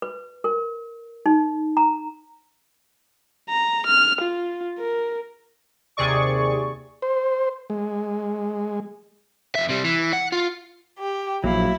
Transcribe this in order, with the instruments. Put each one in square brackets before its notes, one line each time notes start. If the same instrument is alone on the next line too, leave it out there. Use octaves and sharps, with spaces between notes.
[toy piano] B4
A#4
D#4
A#5
[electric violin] A#5
F6
F4
A#4
[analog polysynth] D#2 C3 G#4 D5 C#6
[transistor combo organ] C5
G#3
[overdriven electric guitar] F2 E5
C3 G3
E3
F#5
F4
[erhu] G4
[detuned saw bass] A#1 [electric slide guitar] F#3 A#3 F5 [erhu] E4